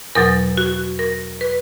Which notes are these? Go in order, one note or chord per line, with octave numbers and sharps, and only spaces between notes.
E2 B2 F#3 A#4
F#4
A#4
B4